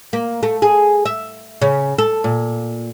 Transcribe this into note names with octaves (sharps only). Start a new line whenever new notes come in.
A#3
A3
G#4
E5
C#3
A4
A#2